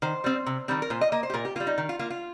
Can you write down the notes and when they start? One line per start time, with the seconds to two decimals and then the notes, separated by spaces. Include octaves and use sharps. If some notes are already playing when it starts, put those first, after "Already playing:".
0.02 D#3 C5
0.24 G3 C4
0.46 C3
0.68 D#3 G3 C4
0.82 A#4
0.90 A#2 C5
1.01 D#5
1.12 A#3 D#5
1.23 C5
1.30 G4
1.34 A#2 A#4
1.45 G4
1.56 G3 A#3 F4
1.67 D#4
1.78 D#3
1.89 F4
1.99 A#3 F4
2.10 F4